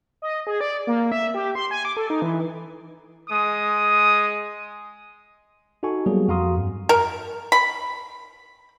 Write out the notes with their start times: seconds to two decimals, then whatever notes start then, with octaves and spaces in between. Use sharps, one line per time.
0.22 D#5
0.47 G#4
0.61 D5
0.87 A#3
1.12 E5
1.34 G4
1.55 C6
1.71 G#5
1.85 D6
1.97 A4
2.10 D#4
2.22 E3
3.29 G#3 D#6
5.83 D#4 F#4 A4 G#5 C#6
6.06 F#3 G3 A#3 B3 G#4
6.28 F2 F#4 F5 A#5 C6 D#6
6.56 G2
6.89 A#4
7.52 B5